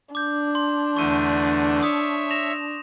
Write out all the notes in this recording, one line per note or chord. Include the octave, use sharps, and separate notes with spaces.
D4 D6 G6
C6
E2 D3 A3 C#6 D#7
C#5 E5 D#6
A#6 E7 F7